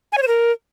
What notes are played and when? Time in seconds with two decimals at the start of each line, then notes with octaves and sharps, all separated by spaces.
0.12 G#5
0.17 C#5
0.22 C5
0.28 A#4